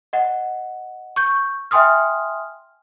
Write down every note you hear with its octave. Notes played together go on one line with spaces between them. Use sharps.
D#5 F#5
C#6 G6
E5 G5 G#5 C6 D#6 F6